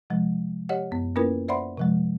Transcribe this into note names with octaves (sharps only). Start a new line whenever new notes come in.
C3 F3 G#3
G4 C#5 D#5 F#5
F#2 B3
A#3 C#4 E4 F4 A#4 B4
C5 D5 E5 F#5 B5 C6
C3 F3 G#3